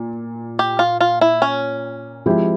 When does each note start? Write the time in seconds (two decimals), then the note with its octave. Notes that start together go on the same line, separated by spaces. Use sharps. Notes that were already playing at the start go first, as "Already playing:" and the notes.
Already playing: A#2
0.59 G4
0.79 F4
1.01 F4
1.21 E4
1.42 C#4
2.26 F3 G#3 C4 E4 G4